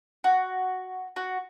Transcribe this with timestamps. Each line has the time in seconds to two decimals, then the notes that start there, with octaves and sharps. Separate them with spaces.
0.24 F#4
1.16 F#4